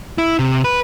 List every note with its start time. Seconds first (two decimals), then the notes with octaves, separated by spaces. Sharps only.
0.18 E4
0.39 C3
0.64 B4